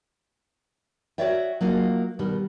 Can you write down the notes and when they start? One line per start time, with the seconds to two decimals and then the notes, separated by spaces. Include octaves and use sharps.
1.18 F#4 G#4 C#5 D5 E5 G5
1.61 F#3 A#3 D#4 F4
2.19 B2 D#3 G3